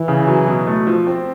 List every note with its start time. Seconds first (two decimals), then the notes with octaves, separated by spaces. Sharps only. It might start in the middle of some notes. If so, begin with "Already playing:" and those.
Already playing: E3
0.08 C#3
0.27 F#3
0.47 B2
0.67 A3
0.87 F3
1.07 C4